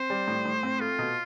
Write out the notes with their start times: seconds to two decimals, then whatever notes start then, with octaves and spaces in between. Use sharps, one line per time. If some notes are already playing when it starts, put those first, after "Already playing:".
Already playing: C4 C5
0.10 G3
0.28 A2
0.45 A2
0.63 C4
0.80 A3 F4
0.98 B2